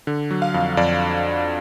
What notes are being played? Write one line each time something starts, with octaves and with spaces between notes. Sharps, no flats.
D3
F#3
F5
F2
F2 D5